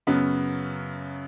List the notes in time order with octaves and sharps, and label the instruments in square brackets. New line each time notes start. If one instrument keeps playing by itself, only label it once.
[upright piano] F#2 C#3 F#3 B3